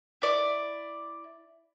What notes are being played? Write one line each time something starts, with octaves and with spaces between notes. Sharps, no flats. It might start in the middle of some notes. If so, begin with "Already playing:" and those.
E4 D5